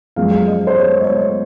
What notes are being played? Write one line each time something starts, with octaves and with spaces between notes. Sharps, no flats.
F#2 F3 G#3 F5
D#5
C5
C#5
D#5
C#5